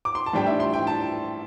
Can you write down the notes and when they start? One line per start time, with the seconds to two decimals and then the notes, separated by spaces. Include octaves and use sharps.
0.05 D6
0.15 C6
0.26 A5
0.33 A2 E3 G3 D4 G5
0.46 E5
0.60 C6
0.74 G5
0.87 A5